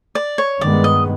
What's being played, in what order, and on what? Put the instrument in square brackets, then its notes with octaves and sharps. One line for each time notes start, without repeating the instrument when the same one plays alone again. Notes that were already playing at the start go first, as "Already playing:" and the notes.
[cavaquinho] D5
C#5
[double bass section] G2 D#3 G#3 B3 [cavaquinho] D5
[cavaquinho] D#5